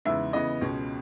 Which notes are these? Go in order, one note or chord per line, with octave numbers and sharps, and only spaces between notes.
E2 C#3 G#3 B3 D#4 E5
C#3 E3 B3 D#5
C#2 B2 G#3 C#4